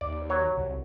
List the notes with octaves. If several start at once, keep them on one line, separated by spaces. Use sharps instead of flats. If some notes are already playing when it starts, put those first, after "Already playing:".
D#2 D5
F#3 C#5
C2